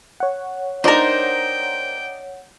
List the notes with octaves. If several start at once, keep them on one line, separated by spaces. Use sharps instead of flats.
C#5 F#5
D4 D#4 A#4 C5 D5 G5